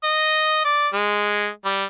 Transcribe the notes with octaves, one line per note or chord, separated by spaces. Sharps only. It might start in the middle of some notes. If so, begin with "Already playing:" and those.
D#5
D5
G#3
G3